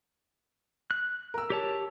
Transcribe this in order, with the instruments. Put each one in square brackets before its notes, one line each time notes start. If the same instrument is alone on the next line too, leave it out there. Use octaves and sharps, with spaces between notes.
[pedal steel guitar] F#6
[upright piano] A#4 E6
[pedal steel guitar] G4 C#5 A5